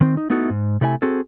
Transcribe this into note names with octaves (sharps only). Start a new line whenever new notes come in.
D#3 C4
D#4
A3 B3 D#4 E4 F#4 A4
G#2
C3 A3 E4 C#5 G#5
C4 F#4 G#4 A4